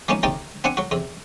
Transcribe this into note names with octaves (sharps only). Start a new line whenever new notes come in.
E3 F3 A#3 B3 C#4 D#4
A1 D#2 C3 D#4 G4 D5
B3 C4 D4 F#5 G#5
F#3 F#4
E2 C3